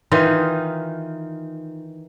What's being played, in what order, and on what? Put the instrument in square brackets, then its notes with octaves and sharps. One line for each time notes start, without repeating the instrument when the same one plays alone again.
[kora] D#3 E3 D#4 F4